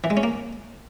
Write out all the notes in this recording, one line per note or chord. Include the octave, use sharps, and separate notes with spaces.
E3
G#3
C#4
A#3